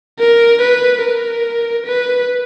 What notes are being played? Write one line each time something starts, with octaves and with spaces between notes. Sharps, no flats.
A#4
B4
A#4
B4